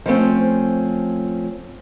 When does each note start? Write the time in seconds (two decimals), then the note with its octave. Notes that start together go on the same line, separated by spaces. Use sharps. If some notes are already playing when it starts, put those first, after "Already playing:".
0.06 F3 G3 A3 C4 C#4